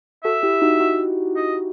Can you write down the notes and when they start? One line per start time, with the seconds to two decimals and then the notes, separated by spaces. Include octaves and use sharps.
0.24 F#4 A4 E5
0.43 E4 G4
0.62 D#4 F#4
0.80 D#4 F#4
1.36 D#5